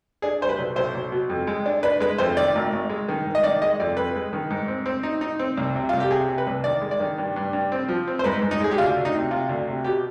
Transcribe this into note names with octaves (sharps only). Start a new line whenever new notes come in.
D4 G#4
G3 C5
B4
B1
B1 C5
B1
B2
F2
G#3
D4
D4 B4
G#3 B4
F2 C5
D#3 D5
G#1
G#1
G#3
D#3
G#2
D#5
D#3 D5
G#3 D#5
F2 D5
F2 B4
G#3
D#3
G#2
C4
C4
D#4
D#4
C4
C2
C3
C2 F4
G4
C3 G#4
C3
B4
C2
D#3 D5
G#3
D5
D#3
G2
G2
G2
C4
F3
C4
C5
G#2 B4
G#2
D#4
G#3 G#4
G4
D2 F4
D2
D#4
C3
C3 F4
D2
C3
B2 G4